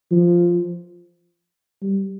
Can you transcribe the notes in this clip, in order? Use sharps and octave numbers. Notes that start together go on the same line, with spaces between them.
F3
G3